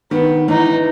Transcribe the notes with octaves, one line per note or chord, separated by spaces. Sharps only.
D#3 B3
E3 D#4